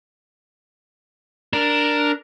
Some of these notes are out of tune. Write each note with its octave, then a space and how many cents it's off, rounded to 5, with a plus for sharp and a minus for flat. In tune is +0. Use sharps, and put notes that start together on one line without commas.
D4 +0 A#4 +0